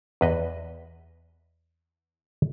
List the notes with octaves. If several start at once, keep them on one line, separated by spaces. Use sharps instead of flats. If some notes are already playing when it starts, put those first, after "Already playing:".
E2 B4 D#5